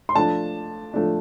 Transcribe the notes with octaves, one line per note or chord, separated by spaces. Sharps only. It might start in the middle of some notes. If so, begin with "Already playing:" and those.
C6
F3 A3 D4 A5
F3 A3 D4